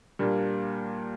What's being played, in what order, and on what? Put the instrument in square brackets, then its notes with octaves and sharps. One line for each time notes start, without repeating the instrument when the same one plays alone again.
[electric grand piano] A#2 G3 A#3 D4